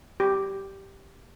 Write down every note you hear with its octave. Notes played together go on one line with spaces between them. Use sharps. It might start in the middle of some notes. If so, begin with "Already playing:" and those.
G4